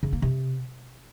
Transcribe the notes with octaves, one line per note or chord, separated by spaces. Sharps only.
C#3
A#3
C3